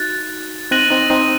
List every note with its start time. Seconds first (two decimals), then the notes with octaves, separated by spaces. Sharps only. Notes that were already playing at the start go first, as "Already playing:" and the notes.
Already playing: D#4 F#4 F#6 A6
0.71 C4 D#4 F#6 A#6 D#7 F#7
0.90 C4 D#4
1.10 C4 D#4